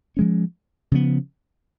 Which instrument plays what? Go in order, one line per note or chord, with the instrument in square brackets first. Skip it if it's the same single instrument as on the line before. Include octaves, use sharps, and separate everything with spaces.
[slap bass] F3 G#3 C#4
C#3 F3 B3